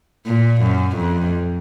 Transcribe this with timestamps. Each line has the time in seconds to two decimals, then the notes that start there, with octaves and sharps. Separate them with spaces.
0.27 A#2
0.62 F#2
0.97 F2